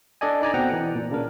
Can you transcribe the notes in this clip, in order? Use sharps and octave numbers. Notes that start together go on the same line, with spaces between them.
D4 A4 D5 D#5 G#5
D#4 D5 G#5 A#5
B2 C4 F#5 G5 A#5
E3
A#2
C#3 D4 A#4